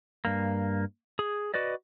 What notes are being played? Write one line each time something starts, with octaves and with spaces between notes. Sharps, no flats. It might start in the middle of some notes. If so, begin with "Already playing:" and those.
G2 A#3
G#4
F#4 B4 D5 D#5